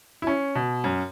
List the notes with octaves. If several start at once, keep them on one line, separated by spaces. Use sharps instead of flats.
E4
C#4
B2
F#2